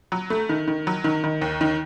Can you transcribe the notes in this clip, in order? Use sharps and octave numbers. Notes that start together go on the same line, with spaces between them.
F#3
A3
D#3
D#3
F#3
D#3
D#3
D#2
D#3